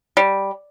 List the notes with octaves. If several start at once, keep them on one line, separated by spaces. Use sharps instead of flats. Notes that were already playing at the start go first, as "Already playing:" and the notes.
G3